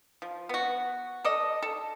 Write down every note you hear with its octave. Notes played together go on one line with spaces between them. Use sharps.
F3
B3 F#4
A4 D5 D#5
A4